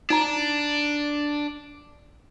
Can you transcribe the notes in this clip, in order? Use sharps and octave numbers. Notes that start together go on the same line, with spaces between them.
D4 D#4 A#5